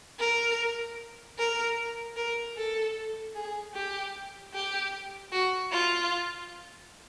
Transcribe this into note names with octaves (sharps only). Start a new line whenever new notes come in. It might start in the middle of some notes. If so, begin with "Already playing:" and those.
A#4
A#4
A#4
A4
G#4
G4
G4
F#4
F4